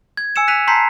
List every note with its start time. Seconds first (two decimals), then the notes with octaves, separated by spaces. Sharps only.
0.17 G#6
0.36 G#5 E6 C#7 E7
0.48 F#6 B6 D#7 F7
0.67 A5 A#5 C6 G6 B6 C7